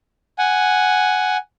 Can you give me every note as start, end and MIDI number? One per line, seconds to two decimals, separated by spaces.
0.38 1.37 78
0.38 1.37 80